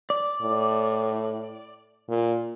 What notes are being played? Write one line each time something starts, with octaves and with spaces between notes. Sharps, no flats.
D5
A2
A#2